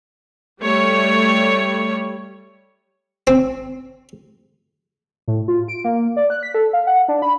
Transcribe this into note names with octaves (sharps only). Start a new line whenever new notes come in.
G3 A3 C#5
C4
A2
F4
D7
A#3
D5
F#6
B6
A4
F5
F#5
D4
B5